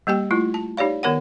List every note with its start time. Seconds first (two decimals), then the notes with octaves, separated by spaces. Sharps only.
0.07 G3 A#3 G4 G5
0.31 A3 E4 F4
0.54 A5
0.77 D#4 G4 C#5 D5 F5
1.03 D#3 B3 A#4 C#5 F#5